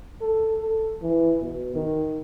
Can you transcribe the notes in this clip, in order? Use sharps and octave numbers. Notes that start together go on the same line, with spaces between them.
A4
A4
E3
B2
D#3